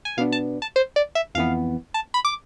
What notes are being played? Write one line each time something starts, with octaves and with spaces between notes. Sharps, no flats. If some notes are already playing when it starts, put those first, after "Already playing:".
G#5
B2 B3 D4 F5
A5
A5
C5
D5
E5
F2 E3 B3 F5
A5
B5
D6